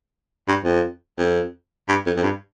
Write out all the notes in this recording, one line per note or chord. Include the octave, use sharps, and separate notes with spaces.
G2
F2
F2
G2
F2
F2
G2